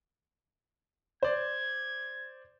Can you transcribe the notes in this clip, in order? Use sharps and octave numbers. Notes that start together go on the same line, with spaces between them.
C5 D5 G#6